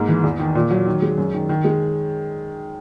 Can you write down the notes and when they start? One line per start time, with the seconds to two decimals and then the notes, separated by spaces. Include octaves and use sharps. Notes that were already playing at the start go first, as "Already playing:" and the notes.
Already playing: G#2 A#3
0.08 E3
0.24 E2
0.39 D#3
0.55 A#2
0.71 F#3
0.86 D#3
1.02 G#3
1.18 F#2
1.34 D#3
1.49 D#3
1.64 G#3